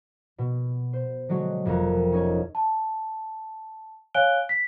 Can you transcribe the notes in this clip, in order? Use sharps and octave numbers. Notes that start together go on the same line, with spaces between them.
B2
C5
D3 F#3 G#3 F#4
F1 F2 C4 A#4
C#4 D#4 C#5
A5
C#5 F5 G#5 F#6 D7 G7
B6